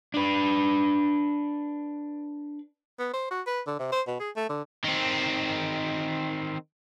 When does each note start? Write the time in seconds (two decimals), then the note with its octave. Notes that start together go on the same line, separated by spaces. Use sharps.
0.14 D4 B4
2.99 B3
3.13 C5
3.30 F#4
3.46 B4
3.67 D3
3.79 C3
3.92 C5
4.07 B2
4.20 G#4
4.36 A3
4.49 D3
4.85 D#3 C4